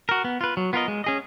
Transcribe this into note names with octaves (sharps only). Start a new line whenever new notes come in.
F#4 A#4
B3
F4 B4
F#3
B3 F4 A#4 D#5
G#3
C#4 G#4 D#5